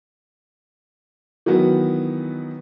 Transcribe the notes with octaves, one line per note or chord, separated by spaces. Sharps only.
D#3 E3 F#3 B3 F#4